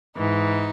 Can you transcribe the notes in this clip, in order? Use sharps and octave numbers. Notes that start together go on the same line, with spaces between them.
G#2 E3 D#4